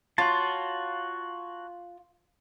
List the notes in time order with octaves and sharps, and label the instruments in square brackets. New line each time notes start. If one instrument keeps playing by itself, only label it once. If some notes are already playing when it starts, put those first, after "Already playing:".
[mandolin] F4 [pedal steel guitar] F#4 C#5 A5